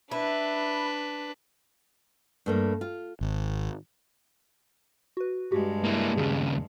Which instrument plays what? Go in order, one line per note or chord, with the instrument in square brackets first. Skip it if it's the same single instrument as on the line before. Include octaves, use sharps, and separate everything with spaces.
[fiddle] D4 B4 [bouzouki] E4
[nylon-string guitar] G2 A3 A#3
F4
[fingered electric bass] G#1
[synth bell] F#4 B4
[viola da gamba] G2 G#3 [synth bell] F#4 G4
[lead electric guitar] A#3 E4
[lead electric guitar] D#2 C#3 [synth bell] G#4